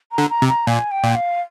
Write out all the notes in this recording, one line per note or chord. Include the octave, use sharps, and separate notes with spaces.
A#5
D3
A#5
C3
A#5
A#2 G#5
G5
A#2
F5